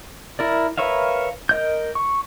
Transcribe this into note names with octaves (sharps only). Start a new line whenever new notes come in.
E4 A#4 D5
A#4 B4 C#5 E5 F5
A#4 D#5 G6
C#6